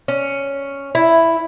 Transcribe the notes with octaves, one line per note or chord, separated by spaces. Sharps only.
C#4
E4